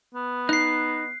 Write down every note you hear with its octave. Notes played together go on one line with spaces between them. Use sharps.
B3
D#4 F#6 C7